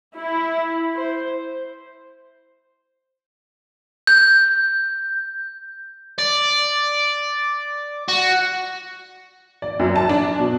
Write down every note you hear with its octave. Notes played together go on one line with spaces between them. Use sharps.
E4
C5
G6
D5
F#4
D5
F#2
A5
D4
B2